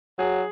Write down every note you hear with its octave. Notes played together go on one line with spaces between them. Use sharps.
F#3 G#4